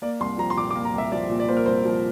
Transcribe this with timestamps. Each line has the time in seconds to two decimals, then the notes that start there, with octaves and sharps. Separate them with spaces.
0.02 A#3 D5
0.20 C2 C6
0.38 F3 A#5
0.50 C6
0.57 A#2 D6
0.70 D6
0.75 A#3
0.85 A#5
0.94 C2 E5
1.12 F3 D5
1.30 A#2
1.40 D5
1.49 A#3 C5
1.57 A#4
1.66 C2 C5
1.85 F3